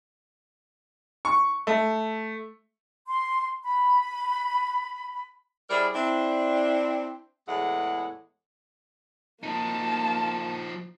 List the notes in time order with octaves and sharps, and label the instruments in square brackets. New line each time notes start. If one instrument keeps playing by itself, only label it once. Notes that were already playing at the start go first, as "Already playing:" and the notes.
[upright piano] C#6
A3
[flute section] C6
B5
[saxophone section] G3 E4 G#4 A#4 C5 D5
C4 D4 E4
E2 A2 G#3 E4 F#5
[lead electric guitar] F3 D#4 [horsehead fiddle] A#3 A5